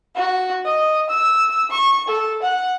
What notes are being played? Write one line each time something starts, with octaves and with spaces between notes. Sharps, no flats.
F#4
D#5
E6
C#6
A4
F#5